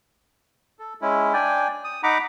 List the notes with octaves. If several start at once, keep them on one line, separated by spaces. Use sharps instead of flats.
A4
G#3 C#4 E4
D4 D5 G5 G#5
D#6
D#4 F#5 A#5 B5 D6